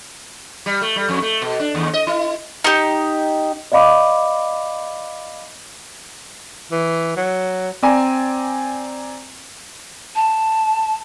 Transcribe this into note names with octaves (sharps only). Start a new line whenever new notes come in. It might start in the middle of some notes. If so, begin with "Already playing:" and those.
G3
A3
G3
F2
A3
B2
D4
D#2
D#5
E4
D#4 G4
D5 D#5 F5 B5 D6
E3
F#3
C4 D5 G#5 A#5
A5